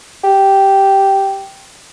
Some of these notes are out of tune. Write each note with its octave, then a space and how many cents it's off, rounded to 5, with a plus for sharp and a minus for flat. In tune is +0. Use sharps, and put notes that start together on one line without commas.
G4 -5